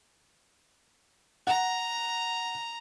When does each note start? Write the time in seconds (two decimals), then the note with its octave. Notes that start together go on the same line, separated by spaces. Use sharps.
1.47 F#5 A#5